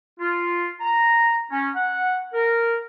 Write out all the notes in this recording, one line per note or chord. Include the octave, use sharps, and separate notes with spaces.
F4
A#5
C#4
F#5
A#4